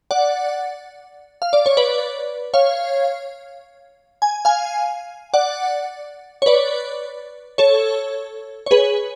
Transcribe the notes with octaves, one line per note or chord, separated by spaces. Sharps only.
D5 F#5
F5
D5
C#5
B4 D5
C#5 F5
G#5
F5 G#5
D5 F#5
C#5
B4 D5
A4 C#5
C#5
G#4 B4